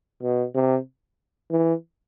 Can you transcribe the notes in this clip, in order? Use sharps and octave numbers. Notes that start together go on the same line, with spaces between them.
B2
C3
E3